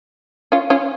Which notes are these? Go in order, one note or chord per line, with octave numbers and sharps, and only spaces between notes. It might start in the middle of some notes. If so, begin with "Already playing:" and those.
C#4 F4
C#4 F4